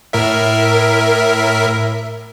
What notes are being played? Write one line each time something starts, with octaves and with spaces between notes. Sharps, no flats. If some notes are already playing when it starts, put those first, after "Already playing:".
A2 A#4 E5